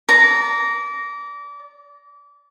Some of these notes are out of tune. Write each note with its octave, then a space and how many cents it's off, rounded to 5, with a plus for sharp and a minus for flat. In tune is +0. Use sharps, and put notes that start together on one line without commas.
D5 -30 A#5 +0